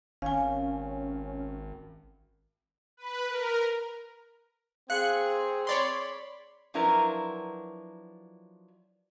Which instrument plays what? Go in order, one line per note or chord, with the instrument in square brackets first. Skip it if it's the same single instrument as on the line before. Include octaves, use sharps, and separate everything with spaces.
[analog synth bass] G#1 [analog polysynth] C#4 [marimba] F5 G#5
[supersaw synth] B4
A#4
[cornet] C4 [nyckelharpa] G#4 [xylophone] F5 [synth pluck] F#6 C#7
[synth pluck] C#5 D5 C6 [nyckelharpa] B5
[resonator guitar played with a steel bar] F3 F#3 D4 E4 A#4 B4